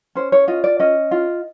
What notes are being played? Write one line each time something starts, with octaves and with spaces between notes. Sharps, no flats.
C#4 C5
C#5
F4 D#5
D5
C#4 D#5
F4